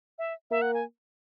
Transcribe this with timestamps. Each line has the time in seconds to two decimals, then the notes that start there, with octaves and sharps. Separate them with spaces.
0.19 E5
0.51 A#3 E5
0.62 F#5
0.74 G#5